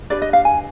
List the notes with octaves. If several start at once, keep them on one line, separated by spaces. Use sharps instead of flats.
D4 G4 B4 D5
D#5
F5
G#5